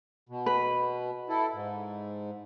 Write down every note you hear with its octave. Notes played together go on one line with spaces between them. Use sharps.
B2
B4
E4 A4
G#2